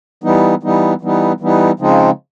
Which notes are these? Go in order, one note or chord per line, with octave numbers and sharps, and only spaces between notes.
E3 G3 B3 D#4
E3 G3 B3 D#4
E3 G3 B3 D#4
E3 G3 B3 D#4
C#3 F3 G#3 C4 D#4